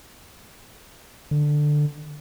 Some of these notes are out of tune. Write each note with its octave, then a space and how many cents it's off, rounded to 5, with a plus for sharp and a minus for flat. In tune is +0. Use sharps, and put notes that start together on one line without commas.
D3 +10